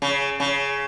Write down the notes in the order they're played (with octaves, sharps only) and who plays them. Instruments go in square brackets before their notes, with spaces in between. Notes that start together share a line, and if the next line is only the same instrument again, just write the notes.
[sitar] C#3
C#3